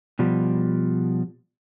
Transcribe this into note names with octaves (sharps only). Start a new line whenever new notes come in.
B2 F3 G3